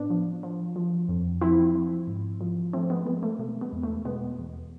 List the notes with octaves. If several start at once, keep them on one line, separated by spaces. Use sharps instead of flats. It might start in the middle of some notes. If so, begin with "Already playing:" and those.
Already playing: A2 B3 D4
F3
F3
F3
F2
F3 C4 E4
F3
G#2
F3
F3 A3 C4
G#3 B3
F3 G#3 B3
A3
B2 A3
G#3 B3
E2
A3
B2 G#3 B3
E2